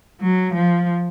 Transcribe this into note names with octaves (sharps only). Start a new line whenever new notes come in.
F#3
F3